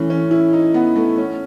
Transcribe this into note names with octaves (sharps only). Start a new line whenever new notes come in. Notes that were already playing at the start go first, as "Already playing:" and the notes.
Already playing: E3 A3 C#4
C#4
E4
D#4
B3
A3
C#4